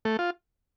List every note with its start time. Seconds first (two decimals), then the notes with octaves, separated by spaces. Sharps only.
0.05 A3
0.19 F4